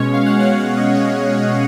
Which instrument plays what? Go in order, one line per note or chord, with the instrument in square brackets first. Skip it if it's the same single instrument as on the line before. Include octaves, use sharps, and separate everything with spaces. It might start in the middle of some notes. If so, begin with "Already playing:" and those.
Already playing: [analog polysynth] B2 G#3 C#4 C#5
F5
F#5
B2 G#3 C#4 F#5
F5
D#5
B2 G#3 C#4
B2 G#3